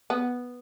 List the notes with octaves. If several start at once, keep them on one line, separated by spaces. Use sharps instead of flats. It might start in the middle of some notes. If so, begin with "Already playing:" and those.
B3